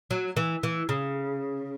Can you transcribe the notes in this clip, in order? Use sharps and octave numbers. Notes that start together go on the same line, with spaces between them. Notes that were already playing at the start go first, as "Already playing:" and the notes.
F#3
E3
E3
C#3